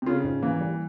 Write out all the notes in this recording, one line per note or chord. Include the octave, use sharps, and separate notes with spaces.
C3
C#3 F4
G#2
E3 A#3
G3